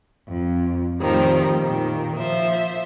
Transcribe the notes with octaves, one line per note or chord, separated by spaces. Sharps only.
F2
F2 A2 D#3 F3 G3
A#2 D#3
F3 C5 E5